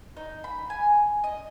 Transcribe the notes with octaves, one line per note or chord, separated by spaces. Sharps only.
D#4
B5
G#5
D#5